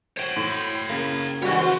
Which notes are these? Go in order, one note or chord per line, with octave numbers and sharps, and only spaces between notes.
F#4 C5 C#5 G5
A2 C6 F#7
C#3 A#3
E3 G3 F#4 C#5 D#5
F3 C5 C6